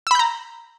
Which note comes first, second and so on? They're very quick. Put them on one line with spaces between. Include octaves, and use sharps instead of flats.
E6 B5 G6 A#5